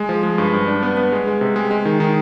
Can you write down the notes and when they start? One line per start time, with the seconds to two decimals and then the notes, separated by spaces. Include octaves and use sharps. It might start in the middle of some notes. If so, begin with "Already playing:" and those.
Already playing: G#3
0.09 F3
0.23 G#3
0.38 G2
0.53 G2
0.68 D4
0.83 B3
0.97 B3
1.12 G#3
1.27 G#3
1.41 C3
1.56 G#3
1.71 G#3
1.85 D#3
2.00 D#3